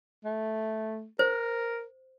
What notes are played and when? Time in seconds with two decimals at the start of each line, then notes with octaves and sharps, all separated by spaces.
0.25 A3
1.19 A#4 C5